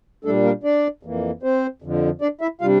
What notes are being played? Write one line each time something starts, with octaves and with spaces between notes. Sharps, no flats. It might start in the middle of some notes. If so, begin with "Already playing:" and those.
A#2 G3 A3 D4 A4
A#3 A#4
D4 D5
F2 E3 A#3
C4 C5
F2 D3 F3
D4 D5
E4 E5
C3 G3 D4 F4 F5